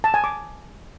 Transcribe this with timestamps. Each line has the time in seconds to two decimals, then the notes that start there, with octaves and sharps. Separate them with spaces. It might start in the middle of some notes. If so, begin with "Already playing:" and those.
0.04 A5
0.14 G#5
0.24 D6